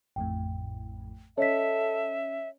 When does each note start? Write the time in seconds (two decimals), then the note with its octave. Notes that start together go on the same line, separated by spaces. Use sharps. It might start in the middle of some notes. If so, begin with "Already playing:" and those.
0.16 A1 F2 A2 G5
1.38 C#4 A4 C#5 D#5 E5 B6